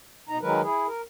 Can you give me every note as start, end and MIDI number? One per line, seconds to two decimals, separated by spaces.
0.29 0.38 47
0.29 0.38 63
0.29 0.38 82
0.41 0.61 51
0.41 0.61 54
0.41 0.61 56
0.41 0.61 70
0.41 0.61 71
0.62 0.87 64
0.62 0.87 68
0.87 1.02 70